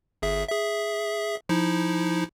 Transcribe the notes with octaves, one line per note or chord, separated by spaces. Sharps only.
G1 G#4 E5
G#4 E5
F3 D#4 E4